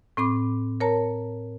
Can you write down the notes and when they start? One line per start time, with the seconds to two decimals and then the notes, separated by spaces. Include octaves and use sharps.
0.17 A2 C4 B5 D6
0.80 A#4 C#5 A5 A#5